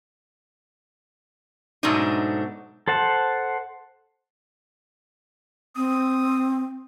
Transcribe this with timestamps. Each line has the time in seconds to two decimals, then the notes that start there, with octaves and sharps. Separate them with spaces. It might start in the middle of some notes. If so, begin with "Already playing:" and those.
1.83 G#2 B2 F#3 A3 D4 D#4
2.88 A4 C5 F#5 A5
5.76 C4 D#6